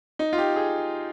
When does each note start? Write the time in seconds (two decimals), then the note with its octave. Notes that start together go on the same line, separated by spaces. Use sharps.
0.19 D#4
0.33 F4
0.38 G4
0.56 G#4